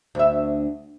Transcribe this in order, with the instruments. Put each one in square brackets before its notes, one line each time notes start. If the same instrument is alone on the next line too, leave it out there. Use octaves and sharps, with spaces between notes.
[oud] D2 E5